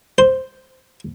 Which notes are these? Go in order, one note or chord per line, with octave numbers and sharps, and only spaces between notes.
C5